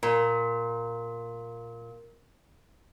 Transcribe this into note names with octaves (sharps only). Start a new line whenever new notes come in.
A#2 A#4